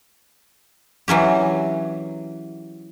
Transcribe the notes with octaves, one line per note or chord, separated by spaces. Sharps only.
E3 F#3 C#4 G4